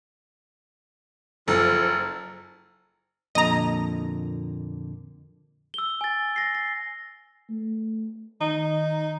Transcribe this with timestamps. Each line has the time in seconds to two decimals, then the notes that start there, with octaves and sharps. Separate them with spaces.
1.48 F#1 F3 A4
3.35 F2 A#2 D3 D#5 A#5
5.74 E6 G7
6.01 G#5 A6
6.36 A#6 C7
6.55 A#6
7.50 A3
8.41 D#3 D#4